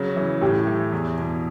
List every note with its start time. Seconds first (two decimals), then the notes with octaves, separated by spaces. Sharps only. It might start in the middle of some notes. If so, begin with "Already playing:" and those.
Already playing: C#3 F#3
0.16 E3
0.41 A2 G4
0.67 E3
0.92 E2
1.18 B2